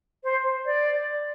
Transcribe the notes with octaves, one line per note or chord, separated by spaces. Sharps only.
C5
D5